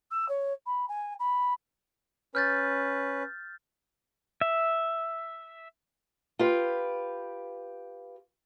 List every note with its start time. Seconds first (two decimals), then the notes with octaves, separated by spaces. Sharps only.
0.11 E6
0.28 C#5
0.66 B5
0.88 G#5
1.19 B5
2.35 C#4 B4 F6 G6 A6
4.41 E5
6.39 F4 G4 B4